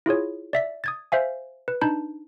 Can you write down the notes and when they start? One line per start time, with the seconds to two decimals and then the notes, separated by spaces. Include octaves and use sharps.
0.06 E4 F4 G#4 C#5
0.53 D5 E5 B6
0.84 D#6 G#6 A6
1.12 C5 E5 F5 G#5
1.68 B4
1.81 D4 D#4 A5 B5 G6